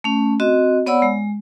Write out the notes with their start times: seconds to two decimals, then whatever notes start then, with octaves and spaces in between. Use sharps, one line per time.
0.04 A3 C#4
0.40 C4 F#4 D#5
0.86 B3 C#5 D5 F#5 B5 E6
1.02 G#3